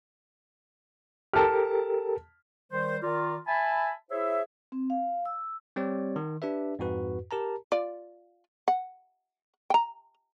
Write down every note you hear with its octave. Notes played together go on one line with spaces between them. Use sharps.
G4 A4 A#4 A5 F6
D#3 G3 C5
D#3 F4 A#4 D5
E5 G#5 A5 B5
E4 G#4 C5 C#5 E5
C4
F5
E6
G3 C4 G4 C#5 D5
D#3
D4 G4 B4 E5
F2 G#2 F#4 B4
G4 A#4 A5 A#5
F4 D5
F#5
G5 A#5